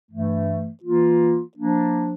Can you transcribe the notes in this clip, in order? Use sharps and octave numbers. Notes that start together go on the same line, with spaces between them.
G2 E3 A3
E3 A#3 F4
F3 A#3 D4